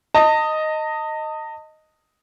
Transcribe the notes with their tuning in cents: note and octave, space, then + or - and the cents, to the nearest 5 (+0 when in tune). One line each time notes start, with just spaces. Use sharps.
D#5 +0 A5 +40